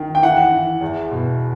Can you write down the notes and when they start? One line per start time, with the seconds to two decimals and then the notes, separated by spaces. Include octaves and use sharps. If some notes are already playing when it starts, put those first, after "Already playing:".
Already playing: D#3
0.15 G5
0.22 E3 F#5
0.52 E3
0.81 E2
1.12 B2